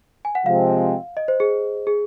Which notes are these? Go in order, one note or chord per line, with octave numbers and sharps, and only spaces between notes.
G#5
F#5
C3 F3 G#3 C4 F5
D#5
C5
G#4
G#4